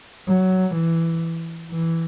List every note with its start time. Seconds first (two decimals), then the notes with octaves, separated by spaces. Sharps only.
0.27 F#3
0.75 E3
1.71 E3